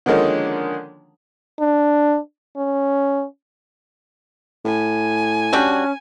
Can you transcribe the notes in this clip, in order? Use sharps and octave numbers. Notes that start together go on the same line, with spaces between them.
D3 D#3 F3 G#3 A#3 C#4
D4
C#4
A2 G#5
G3 C#4 D4 F#4